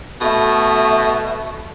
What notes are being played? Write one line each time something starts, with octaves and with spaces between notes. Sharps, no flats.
B2 A3 E5